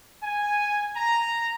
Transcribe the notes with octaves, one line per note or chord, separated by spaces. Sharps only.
G#5
A#5